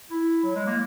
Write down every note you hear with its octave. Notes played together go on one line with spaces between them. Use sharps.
E4
F#3
G#3
A#3